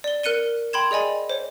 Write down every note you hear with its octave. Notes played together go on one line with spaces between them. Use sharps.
D5 G7
A#4 F#6 C#7 D#7 G7
G5 B5 C6 G#6 E7
G#4 D5 D#5 G#5 B5
C5 C#5